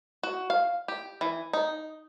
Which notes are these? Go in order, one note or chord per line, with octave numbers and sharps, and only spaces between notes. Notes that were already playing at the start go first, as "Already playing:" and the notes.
F#4
F5
G4
E3
D#4